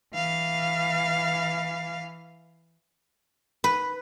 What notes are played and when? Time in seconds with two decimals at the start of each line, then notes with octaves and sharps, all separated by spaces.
0.15 E3 F5
3.64 B4